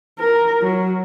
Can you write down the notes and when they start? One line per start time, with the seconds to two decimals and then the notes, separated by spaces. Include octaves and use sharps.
0.19 A#4
0.62 F#3